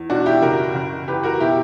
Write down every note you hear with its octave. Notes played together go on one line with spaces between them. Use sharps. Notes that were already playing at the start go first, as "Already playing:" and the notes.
Already playing: E2
B2 D4 F#4
E4 G4
F#1 F#4 A#4
F#1
E2 G4 B4
F#4 A#4
B2 E4 G4